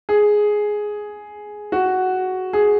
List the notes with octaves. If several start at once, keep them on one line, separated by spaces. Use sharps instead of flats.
G#4
F#4
G#4